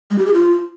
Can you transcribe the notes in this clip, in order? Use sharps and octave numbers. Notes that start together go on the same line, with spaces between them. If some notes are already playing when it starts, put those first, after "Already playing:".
G#3
G4
G#4
F4